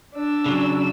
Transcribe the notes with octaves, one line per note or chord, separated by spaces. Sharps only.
D4 E6
C#3 F#3